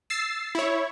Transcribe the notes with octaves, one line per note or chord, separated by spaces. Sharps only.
E6 A6 C7
E4 C#5